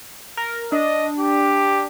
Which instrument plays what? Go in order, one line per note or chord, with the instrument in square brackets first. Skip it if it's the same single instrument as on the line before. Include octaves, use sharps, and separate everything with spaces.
[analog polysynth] A#4
[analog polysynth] D4 [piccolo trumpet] D#5
[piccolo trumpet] G4